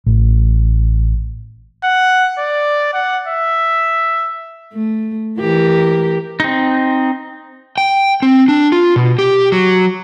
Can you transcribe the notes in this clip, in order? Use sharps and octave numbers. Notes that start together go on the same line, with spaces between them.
A1
F#5
D5
F#5
E5
A3
E3 G4 A#4
C4 D#4
G5
C4
D4
F4
B2
G4
F#3